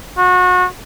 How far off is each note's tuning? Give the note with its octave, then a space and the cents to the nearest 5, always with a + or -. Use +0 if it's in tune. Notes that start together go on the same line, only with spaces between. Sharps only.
F#4 -30